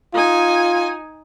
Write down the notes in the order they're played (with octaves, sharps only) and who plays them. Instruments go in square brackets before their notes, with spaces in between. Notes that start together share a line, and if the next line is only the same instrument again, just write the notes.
[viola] D#4 G#5 [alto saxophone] F4